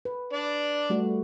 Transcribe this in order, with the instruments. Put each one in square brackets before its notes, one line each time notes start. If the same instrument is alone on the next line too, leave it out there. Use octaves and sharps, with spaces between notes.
[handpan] B4
[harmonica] D4 D5
[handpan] G3 A3 F#4